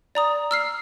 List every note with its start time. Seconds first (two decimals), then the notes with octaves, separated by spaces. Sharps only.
0.15 D5 A#5 D#6
0.51 E6 F6 C7